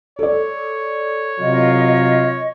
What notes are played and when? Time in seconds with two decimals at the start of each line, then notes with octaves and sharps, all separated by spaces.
0.19 A4 C#5 D5
1.39 C3 F#3 F4 D#5